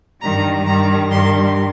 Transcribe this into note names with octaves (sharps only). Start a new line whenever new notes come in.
G2 D#3 G3 A#5
G2 D#3 G3 A#5
G2 D#3 G3 C6